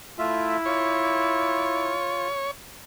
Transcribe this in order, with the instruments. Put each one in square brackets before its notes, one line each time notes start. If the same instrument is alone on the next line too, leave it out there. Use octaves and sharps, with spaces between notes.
[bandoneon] A3 F4 E5 [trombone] E4
[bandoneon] F4 [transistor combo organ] C#5